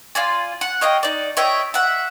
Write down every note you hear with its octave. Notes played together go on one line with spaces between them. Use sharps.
F4 D5 G#5
F#5
C#5 D#5 F5 G5
D#4 D5
C#5 D#5 E5 G5
E5 F#5